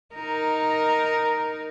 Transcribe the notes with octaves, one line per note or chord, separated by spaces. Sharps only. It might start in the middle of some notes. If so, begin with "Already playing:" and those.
D#4 A#4